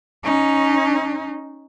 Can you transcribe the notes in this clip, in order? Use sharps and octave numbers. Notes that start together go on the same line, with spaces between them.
C#4 D#4